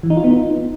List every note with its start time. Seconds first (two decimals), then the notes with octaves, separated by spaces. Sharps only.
0.03 E3
0.10 D#4
0.17 F4
0.24 B3
0.31 D#4